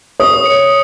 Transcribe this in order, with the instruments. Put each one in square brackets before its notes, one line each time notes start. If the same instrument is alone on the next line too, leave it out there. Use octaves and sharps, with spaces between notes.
[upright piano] C#5 [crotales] D#6
[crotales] C#7